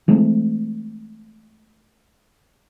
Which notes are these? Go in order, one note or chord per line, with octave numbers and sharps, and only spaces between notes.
E3 G#3 A3 C4